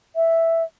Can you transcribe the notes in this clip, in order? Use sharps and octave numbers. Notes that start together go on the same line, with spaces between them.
E5